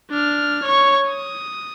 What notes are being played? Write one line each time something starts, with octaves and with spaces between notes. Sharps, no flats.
D4 F6
C#5 C#6
D#6